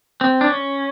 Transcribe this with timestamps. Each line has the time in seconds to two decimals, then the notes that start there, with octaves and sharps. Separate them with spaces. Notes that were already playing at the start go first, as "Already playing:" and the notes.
0.21 C4
0.41 D4
0.50 C#4